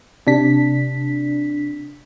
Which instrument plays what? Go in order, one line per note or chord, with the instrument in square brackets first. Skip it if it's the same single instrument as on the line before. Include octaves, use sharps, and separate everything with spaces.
[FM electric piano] C3 D4 B6